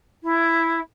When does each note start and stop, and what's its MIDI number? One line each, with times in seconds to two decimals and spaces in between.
0.23 0.79 64